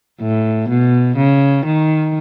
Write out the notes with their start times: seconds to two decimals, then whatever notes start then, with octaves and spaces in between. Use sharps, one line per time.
0.22 A2
0.69 B2
1.17 C#3
1.66 D#3